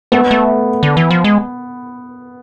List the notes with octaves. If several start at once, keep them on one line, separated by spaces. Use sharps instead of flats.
A3 B3
A3
D3
E3
F3
G#3